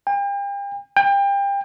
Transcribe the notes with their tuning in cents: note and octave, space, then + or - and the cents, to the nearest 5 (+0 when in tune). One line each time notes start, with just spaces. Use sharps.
G5 +40
G5 +30